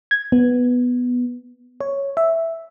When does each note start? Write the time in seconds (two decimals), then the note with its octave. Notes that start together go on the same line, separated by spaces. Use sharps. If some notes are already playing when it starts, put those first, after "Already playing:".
0.11 G#6
0.32 B3
1.81 C#5
2.17 E5